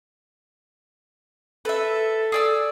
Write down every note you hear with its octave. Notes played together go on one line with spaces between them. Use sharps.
A4 B4 E5
G#4 D5 E6